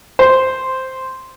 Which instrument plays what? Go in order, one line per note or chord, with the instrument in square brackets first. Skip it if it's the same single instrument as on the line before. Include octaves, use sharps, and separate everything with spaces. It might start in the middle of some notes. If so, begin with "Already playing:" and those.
[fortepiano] C5